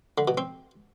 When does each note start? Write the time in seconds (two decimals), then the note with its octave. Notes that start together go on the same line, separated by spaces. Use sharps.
0.18 D3
0.28 B2
0.38 C4